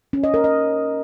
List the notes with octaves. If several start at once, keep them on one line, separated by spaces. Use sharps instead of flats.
C#4
D#5
A#4
D#5